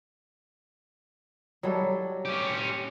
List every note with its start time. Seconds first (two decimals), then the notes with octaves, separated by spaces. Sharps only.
1.63 F#3 G3 A4
2.25 C#4 G4